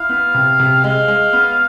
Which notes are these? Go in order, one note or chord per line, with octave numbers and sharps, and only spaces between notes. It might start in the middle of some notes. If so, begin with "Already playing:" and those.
Already playing: E4 F5
B3
C3
C3
G#3 F5
G#3
B3